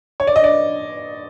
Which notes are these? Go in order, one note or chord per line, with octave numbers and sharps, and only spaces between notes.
C#5
D5
D#5
D5